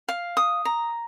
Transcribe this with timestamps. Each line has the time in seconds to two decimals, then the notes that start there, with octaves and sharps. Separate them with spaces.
0.08 F5
0.37 D#6
0.65 A#5